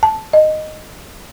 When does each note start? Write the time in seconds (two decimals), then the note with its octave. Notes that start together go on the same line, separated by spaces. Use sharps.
0.03 A5
0.33 D#5